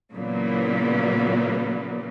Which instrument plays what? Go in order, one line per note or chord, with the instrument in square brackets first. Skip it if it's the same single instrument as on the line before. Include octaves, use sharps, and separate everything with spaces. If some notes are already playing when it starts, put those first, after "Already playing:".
[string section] A#2 C#3 E3 F#3 A#3 B3